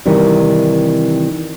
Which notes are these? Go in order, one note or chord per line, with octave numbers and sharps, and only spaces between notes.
C3 D#3 E3 G3